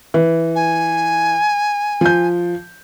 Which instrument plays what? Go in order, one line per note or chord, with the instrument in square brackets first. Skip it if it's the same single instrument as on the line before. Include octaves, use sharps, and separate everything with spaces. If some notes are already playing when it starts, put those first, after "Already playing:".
[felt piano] E3
[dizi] G#5
[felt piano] F3 G6